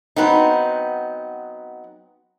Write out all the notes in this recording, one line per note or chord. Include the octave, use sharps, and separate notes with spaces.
F#3 B3 C4 D#4